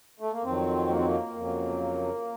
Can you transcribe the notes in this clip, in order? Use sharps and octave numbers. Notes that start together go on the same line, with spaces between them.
A3
A#3
F2 D#3 F#3 C4
A#3
C4
A#3
F2 C#3 F#3